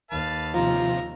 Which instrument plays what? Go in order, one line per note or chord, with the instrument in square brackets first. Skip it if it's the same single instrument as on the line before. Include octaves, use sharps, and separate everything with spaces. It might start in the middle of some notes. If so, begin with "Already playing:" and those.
[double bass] D#2 [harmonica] B4 F5 A5
[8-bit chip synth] C3 F3 [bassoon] F4 [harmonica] A#5